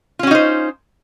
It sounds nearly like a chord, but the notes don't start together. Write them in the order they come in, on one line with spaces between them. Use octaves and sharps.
F4 C#4 F#4 D#4 C5